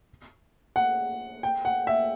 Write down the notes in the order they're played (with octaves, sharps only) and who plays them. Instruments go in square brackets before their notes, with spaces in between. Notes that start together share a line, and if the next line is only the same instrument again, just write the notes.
[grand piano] F#5
G5
F#5
E5